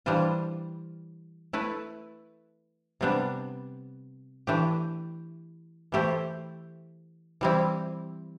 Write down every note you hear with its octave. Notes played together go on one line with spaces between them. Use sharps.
E3 G3 D4 F4 C5
A3 E4 B4
C3 G3 B3 D4
E3 A3 D4 G4
E3 A3 E4 G4 C5
E3 G3 C4 E4